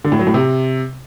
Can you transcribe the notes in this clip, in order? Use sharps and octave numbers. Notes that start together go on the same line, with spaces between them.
D3
A2
F#3
A2
C3